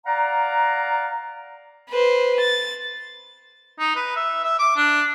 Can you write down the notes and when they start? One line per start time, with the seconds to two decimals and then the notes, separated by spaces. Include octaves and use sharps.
0.06 D5 F5 F#5 A#5
1.90 B4 C5
2.40 A6
3.79 D#4
3.95 B4
4.16 E5
4.44 E5
4.59 D6
4.77 D4